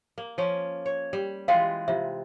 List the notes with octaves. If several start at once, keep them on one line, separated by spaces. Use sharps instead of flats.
A#3
F3 C#4
C#5
G3
E3 G#3 F4 F5 G5
C3 F4 E5